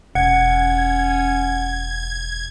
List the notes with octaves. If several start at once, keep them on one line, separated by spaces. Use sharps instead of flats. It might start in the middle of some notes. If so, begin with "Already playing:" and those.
E1 C#4 F#5 G#6